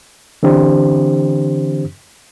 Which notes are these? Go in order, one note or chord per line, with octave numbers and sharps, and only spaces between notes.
D3 E3 C4 D4 G4 C5